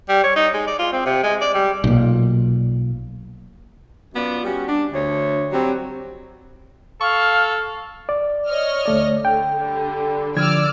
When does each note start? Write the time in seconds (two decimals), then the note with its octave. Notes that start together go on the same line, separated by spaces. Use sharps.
0.09 G3
0.24 C#5
0.36 D#4
0.54 G#3
0.67 D5
0.79 F4
0.92 C4
1.06 C3
1.23 G#3
1.41 D5
1.54 G3
1.84 B1 A#2
4.14 F#2 B3 F4 D5
4.44 G3 C#4 F#4
4.68 D4
4.92 D2 C#5
5.52 F#3 G3 C4
7.01 A4 F5 C#6
8.09 D5
8.47 C#5 D#5 F6
8.86 D2 A3 D5
9.25 D3 G5
9.56 D3 G3
10.36 D3 F3 D5 E6 F6 G#6